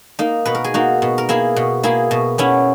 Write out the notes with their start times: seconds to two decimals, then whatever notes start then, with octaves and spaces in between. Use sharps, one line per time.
0.19 A#3 D#4
0.45 B2 B4
0.55 A#4
0.64 G#4
0.74 A#3 D#4 F#4
1.02 B2
1.18 A#4
1.29 A#3 E4 G#4
1.56 B2
1.83 A#3 E4 G#4
2.11 B2
2.38 B3 C#4 E4